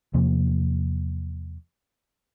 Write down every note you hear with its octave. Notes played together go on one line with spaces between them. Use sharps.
E2 C3 F3 A#3